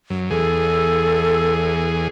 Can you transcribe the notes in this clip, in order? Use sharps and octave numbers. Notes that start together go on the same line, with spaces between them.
F#2
E2 G#4 A4